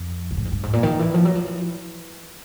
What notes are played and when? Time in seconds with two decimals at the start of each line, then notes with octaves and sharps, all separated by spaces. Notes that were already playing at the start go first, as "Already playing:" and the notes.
Already playing: F2
0.31 A#2
0.37 A2
0.45 G#2
0.52 G2
0.63 G#2
0.73 A#2
0.83 D#3
0.99 E3
1.14 F3
1.25 F#3
1.35 F3
1.46 E3